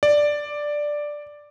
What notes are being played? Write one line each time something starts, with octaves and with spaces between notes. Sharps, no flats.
D5